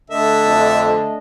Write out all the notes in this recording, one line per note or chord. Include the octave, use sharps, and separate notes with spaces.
D3 A3 D4 A4 D#5 E5
F2